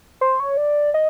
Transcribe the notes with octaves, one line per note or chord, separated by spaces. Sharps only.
C5
C#5
D5
D#5